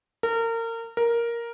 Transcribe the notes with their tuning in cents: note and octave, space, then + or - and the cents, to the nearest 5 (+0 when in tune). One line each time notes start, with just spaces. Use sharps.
A#4 -30
A#4 +5